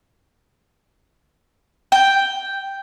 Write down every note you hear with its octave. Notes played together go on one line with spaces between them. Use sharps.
G5